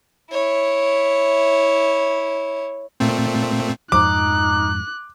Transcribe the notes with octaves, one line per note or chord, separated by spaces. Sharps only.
E4 C#5
A#2 A3 C4
F2 G#2 F3 D#4 D6 F#6